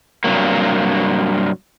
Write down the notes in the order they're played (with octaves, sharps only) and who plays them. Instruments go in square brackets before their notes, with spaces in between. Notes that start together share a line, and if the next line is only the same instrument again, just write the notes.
[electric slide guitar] G2 C3 F#3 A#3